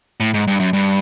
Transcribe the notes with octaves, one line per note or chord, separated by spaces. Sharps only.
A2
G#2
G2
F#2
G2